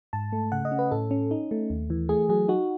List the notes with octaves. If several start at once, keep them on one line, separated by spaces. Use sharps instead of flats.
G#2 A5
A3
C#3 F#5
D#5
C#4
B4
A2 A4
C#4
D#4
A3
D#2
E3
A3 G#4
F#3 G#4
D#4 F#4